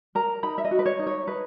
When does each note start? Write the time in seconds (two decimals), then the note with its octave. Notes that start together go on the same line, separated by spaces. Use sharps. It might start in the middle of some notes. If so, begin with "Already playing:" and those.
0.15 A#4 A#5
0.43 D#4 B5
0.58 E5
0.65 D#5
0.71 F#4
0.79 B4
0.86 C#5
0.99 D#4
1.07 C#5
1.27 D#4 B4